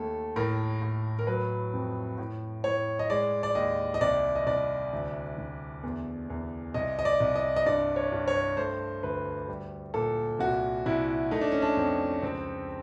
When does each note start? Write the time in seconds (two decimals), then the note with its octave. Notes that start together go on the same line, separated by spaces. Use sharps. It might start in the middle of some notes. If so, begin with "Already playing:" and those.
Already playing: D#2 A3 A4
0.36 A2 A#4
0.82 A2
1.19 A#4
1.27 F#3 B4
1.74 F2
2.18 A2
2.64 A2 C#5
2.99 D#5
3.10 G#3 D5
3.43 D5
3.55 D#2 D#5
3.94 D#5
4.01 C2 D5
4.36 D#5
4.47 C2 D5
4.93 D2
5.38 D2
5.83 E2
6.30 E2
6.74 C2 D#5
6.99 D#5
7.05 D5
7.20 C2
7.36 D#5
7.56 D#5
7.66 G2 D5
7.96 C#5
8.12 G2
8.28 C#5
8.57 A3 C5
9.03 D2 B4
9.48 G3
9.94 A#2 A4
10.39 C2 F#4
10.86 C2 E4
11.31 A3 D#4
11.41 D4
11.52 C#4
11.62 D4
11.77 F2
12.22 C#2 C4